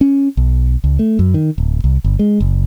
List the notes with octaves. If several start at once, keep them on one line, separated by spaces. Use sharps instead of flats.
C#4
B1
C#2
A3
F#2
D#3
D1
C2
G1
G#3
F#1